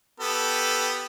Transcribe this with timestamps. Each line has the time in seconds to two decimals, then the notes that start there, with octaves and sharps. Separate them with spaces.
0.20 B3 G4 A4